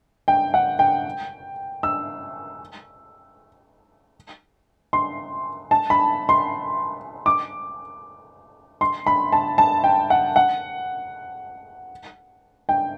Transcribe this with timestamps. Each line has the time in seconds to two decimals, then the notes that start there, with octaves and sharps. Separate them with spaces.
0.28 G5
0.54 F#5
0.79 G5
1.83 E6
4.93 C6
5.71 A5
5.90 B5
6.29 C6
7.26 D6
8.81 C6
9.07 B5
9.32 A5
9.58 A5
9.84 G5
10.10 F#5
10.36 F#5
12.69 G5